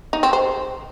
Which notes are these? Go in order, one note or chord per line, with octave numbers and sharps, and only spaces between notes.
D#4
C4
C5